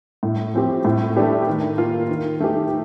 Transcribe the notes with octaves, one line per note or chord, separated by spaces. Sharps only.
A2
F3 C4 G4
A2
A3 D4 G4
D#3
A#3 F4
D#3
A3 D#4 G4